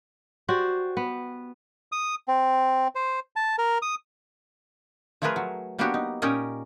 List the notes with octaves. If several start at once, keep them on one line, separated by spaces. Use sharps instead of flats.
F#4 G4 C5 D5
B3
D#6
C4
C5
A5
A#4
D#6
F3 A3 F4 G#4 A#4 B4
F#3
F#3 A#3 B3 D4 F#4 G4
D#4
A#2 C#4 D#4 G4 A#4 D#5